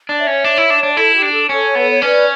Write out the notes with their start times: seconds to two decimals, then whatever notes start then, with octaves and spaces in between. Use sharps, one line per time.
0.09 D4
0.18 C#5 E5
0.27 C#4
0.44 D4
0.58 E4
0.70 D4
0.83 D4
0.97 E4 A4
1.14 G4
1.22 D4
1.32 A4
1.49 C#4 A4 C#5
1.75 B3 B4
1.90 C#5
2.02 C#4 B4 D5